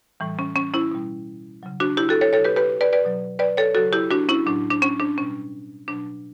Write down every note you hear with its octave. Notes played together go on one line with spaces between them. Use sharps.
A2 E3 G3
C#4
C#4
C#4 E4
B2 G3
C#3 F#3
D4 F#4
E4 G4
F#4 A4
A4 C#5
B2 F#3 A4 C#5
G4 B4
G4 B4
B4 D5
B4 D5
B2 F#3
B4 D5
A4 C#5
C#3 F#3 F#4 A4
E4 G4
D4 F#4
C#4 E4
A2 F#3 D4
D4
C#4
D4
B2 G3 C#4
B2 F#3 D4